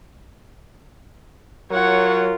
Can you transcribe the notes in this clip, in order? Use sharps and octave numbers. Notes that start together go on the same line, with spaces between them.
F#3 F4 A#4 C#5 F#5